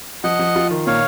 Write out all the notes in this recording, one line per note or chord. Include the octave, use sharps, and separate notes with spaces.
F3 D#5 F#5
F3
F4
D#3
A#2 C#5 F5